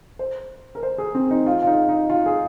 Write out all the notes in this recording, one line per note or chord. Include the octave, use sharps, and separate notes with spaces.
C5
A#4
C5
G#4
C4
D#4
F4
F4
D#4
D#4
F4
G#4